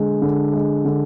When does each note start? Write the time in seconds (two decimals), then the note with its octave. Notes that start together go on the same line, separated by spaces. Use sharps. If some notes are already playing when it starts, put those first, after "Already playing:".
Already playing: D3 G#3
0.22 D3
0.53 G#3
0.85 D3